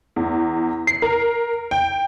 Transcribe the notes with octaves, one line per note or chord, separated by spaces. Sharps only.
E2
C7
A#4
G5